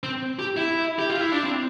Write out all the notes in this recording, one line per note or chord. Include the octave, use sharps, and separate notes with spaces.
C4
G4
E4
G4
F4
E4
D4
C4